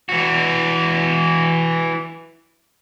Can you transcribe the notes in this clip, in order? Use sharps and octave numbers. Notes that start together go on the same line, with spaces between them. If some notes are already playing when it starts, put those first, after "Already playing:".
E3 F#4